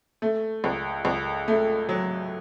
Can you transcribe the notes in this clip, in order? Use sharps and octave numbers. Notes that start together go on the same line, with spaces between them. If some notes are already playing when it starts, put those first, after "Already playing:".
A3
C#2
C#2
A3
F#3